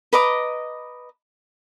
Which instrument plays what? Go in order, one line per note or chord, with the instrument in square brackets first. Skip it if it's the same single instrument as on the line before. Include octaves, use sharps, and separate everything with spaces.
[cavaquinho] B4 D#5 A#5 D6